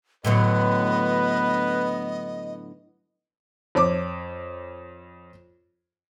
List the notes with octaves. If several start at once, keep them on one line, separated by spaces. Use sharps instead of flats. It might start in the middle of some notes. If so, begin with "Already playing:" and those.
A2 D3 F#3 B3 B4 D#5
F2 C#5 D6